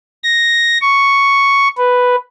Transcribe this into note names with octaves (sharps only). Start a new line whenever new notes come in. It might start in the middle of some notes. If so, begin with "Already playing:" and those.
A#6
C#6
B4